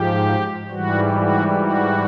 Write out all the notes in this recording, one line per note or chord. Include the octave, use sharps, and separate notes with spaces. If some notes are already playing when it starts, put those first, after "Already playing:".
Already playing: G#2 F3 G4
G#2 E3 G3 F#4
F#4
F#4